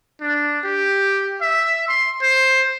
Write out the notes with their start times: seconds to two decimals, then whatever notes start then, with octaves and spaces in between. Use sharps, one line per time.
0.21 D4
0.64 G4
1.41 E5
1.88 C6
2.22 C5